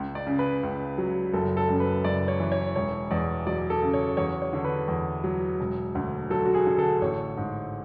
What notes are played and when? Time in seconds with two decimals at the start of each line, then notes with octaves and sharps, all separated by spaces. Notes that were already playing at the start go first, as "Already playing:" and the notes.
Already playing: C#2
0.15 D5
0.27 C#3
0.39 B4
0.63 C#2
0.98 F#3
1.33 F#1 A4
1.57 A4
1.69 F#2
1.80 B4
2.04 F#1 D5
2.28 C#5
2.40 E3
2.52 C#5
2.75 E1 C#5
3.11 E2 D5
3.46 F#3 D5
3.70 A4
3.82 C#3
3.94 C#5
4.17 E2 C#5
4.42 C#5
4.53 D3
4.65 B4
4.88 E2
5.24 F#3
5.60 E1
5.95 D2
6.30 F#3 A4
6.45 F#4
6.55 G#4
6.67 D3
6.78 A4
7.01 A1 C#5
7.37 G#2